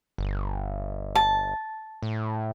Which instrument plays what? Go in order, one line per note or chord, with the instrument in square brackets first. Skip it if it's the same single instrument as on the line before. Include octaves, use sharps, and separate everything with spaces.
[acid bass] G1
[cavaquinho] A5
[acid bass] A2